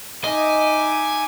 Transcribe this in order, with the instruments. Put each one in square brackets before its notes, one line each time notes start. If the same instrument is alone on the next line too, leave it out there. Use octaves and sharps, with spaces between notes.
[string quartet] D#4 E5 D6 [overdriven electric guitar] D#5 [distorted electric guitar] G#5